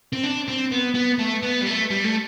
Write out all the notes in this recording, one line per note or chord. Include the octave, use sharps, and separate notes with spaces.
C4
D4
C4
B3
B3
A3
B3
G3
A3
G3
A3